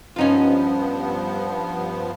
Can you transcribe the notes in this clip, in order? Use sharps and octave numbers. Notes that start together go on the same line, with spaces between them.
G2 F3 B3 C#4 D#4 F4